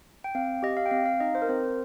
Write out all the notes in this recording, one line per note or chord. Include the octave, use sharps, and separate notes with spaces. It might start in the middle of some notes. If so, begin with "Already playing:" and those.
G5
C4 F5
G4 D#5
F5
G5
C4 F5
F5
D#4 D#5
C5
A#4
C4 C5